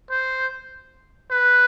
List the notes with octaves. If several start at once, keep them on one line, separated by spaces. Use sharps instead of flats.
C5
B4